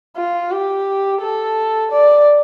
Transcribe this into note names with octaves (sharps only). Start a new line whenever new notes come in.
F4
G4
A4
D5